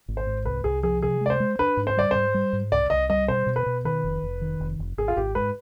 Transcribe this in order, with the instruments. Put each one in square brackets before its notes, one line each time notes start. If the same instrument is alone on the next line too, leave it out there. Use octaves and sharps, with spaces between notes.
[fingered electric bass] G#1
[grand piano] C5
[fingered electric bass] G#2
[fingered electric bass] C2 [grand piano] B4
[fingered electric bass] C2 [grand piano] G#4
[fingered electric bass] F3 [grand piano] G#4
[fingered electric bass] C3 [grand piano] G#4
[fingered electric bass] G#3 [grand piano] D5
[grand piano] C5
[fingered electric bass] G#3
[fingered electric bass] D4 [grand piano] B4
[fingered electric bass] G#2
[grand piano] C5
[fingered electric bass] G3 [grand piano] D5
[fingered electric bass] G#2 [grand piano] C5
[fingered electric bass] G3
G#2
[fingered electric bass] C2 [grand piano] D5
[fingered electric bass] C2 [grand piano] D#5
[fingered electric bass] G3 [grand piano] D#5
[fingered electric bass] B2 [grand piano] C5
[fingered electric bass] B2
[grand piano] B4
[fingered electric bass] B2
[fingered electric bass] D#3 [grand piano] B4
[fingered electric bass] F1
F1
D#3
F1
F1
[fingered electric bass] G#1 [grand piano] G#4
[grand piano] F4
[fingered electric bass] G#1 [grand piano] G4
[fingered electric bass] G#2 [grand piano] B4